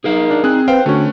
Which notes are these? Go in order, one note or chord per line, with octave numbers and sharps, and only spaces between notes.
D#4 G#4 A#4 F5
D4
C4 G#4 F#6
B4 C5 F5 G5
D3 A3 C#4 F#4